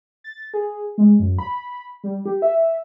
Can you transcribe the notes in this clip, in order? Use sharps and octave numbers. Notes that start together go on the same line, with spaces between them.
A6
G#4
G#3
F#2
B5
G3
G4
E5